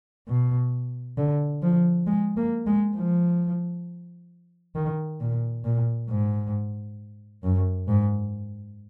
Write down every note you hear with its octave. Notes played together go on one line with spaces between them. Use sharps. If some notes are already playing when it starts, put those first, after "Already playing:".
B2
D3
F3
G#3
A#3
G#3
F3
D#3
A#2
A#2
G#2
F#2
G#2